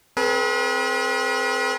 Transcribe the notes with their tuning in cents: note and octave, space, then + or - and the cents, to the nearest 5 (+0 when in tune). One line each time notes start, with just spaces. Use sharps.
C4 +5 G#4 +40 B4 -35